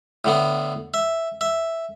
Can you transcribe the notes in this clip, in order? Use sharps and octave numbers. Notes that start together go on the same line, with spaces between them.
A2 D3 B3
E5
E5